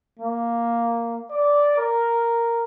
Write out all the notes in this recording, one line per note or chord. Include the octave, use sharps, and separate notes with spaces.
A#3
D5
A#4